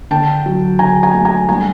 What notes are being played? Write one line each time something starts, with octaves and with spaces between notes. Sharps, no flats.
D3 G5 A5
F#3
D3 G#5 A#5
G#5 A#5
A3
G#5 A#5
G3 G#5 A#5